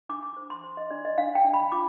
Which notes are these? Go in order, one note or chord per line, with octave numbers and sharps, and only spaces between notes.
D4 D6
D6
C5
C6
C5
D#5
D4 D5
D#5
D4 F5
G5
D4
B5
F4 D6